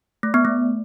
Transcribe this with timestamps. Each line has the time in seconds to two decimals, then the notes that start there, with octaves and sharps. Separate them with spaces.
0.23 A3
0.34 B3
0.45 A3